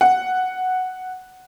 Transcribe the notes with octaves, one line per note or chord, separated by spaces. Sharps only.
F#5